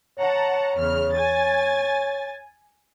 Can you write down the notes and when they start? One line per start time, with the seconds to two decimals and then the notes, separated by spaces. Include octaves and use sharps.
0.19 C#5 F#5 A5 A#5
0.79 E2 C#3 F6
1.13 G#5 A6